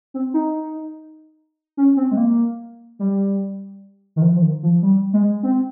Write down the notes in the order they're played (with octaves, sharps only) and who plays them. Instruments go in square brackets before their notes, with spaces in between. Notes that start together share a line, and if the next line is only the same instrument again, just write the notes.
[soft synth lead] C4
D#4
C#4
C4
G#3
A#3
G3
D#3
F3
F3
D#3
F3
G3
G#3
C4